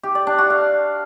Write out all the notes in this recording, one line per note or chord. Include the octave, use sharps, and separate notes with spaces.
G4
D5
D4
F#4
F5